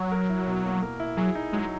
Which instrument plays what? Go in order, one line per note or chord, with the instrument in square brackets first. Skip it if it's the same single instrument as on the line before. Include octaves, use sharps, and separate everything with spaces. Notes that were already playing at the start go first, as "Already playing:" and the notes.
Already playing: [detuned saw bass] F#3
[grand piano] A#4
E4
B2
A#3
A#4
E4
[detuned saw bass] F#3 [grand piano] G#4
[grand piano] D#4
[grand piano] F#3 [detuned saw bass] G#3